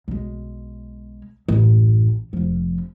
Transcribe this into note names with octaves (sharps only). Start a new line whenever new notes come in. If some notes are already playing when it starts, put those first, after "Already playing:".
B1 G#3
A1 F#2
F1 F3